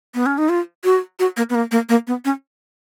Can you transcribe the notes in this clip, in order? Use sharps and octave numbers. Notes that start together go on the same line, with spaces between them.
B3
C#4
D#4
F4
F#4
F#4
A#3
B3
A#3
A#3
A#3
B3
C#4